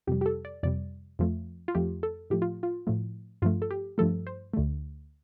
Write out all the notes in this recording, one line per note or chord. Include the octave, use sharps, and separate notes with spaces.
F2 C3 G3 G4
G4
A4
D5
F2 C3 G3 D5
F2 F3 A3
F4
F2 F3 A3 G4
A4
A2 F3 A3 G4
F4
F4
A2 F3 A3
G2 F3 A3 F4
A4
G4
G2 F3 A3 A4
C5
D2 D3 A3